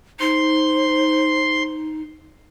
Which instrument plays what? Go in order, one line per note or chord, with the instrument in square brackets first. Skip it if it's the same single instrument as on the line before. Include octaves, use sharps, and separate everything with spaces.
[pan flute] D#4 [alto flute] C5 [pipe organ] C6